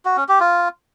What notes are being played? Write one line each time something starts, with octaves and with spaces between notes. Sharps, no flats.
F#4
C#4
G4
F4